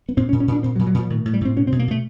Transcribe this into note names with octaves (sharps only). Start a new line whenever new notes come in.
B3
A#2 C4
C#4
A#2
C#4
A#2 D4
A#2 C4
F#3
A#2
F#3
A#2 F3
A2 D#3
A2
G3
A2 C4
B2 C#4
C4
B2
A#3
B2 A3